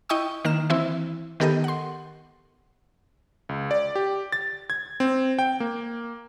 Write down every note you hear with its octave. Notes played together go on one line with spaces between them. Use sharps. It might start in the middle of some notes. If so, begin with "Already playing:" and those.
E4 D#5 G5 C#6 D#6
D#3 A#3 A#5 F6 E7
E3 C4 E4
D#3 B3 G4 A4 A#4 D#5
F#5 C6
C#2
D5
G4
A6
G#6
C4
G5
A#3